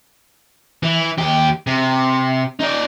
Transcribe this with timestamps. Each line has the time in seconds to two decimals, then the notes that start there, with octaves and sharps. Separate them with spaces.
0.83 E3
1.18 D#2 G4
1.67 C3
2.60 D#4 D5